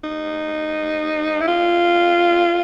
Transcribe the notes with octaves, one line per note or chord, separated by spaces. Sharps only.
D#4
E4
F4